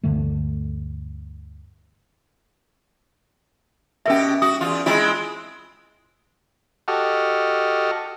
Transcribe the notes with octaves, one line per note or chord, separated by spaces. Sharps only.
D2 G2 D3 A3
B2 C#4 G4 A#4 E5
F#4 D#6
E2 F4
G#3 C4 E4 F4 D#5 B5
F#4 G4 A4 D#5 F6